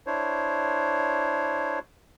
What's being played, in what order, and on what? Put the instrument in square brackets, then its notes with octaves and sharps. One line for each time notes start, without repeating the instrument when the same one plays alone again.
[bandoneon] D4 E4 C5 C#5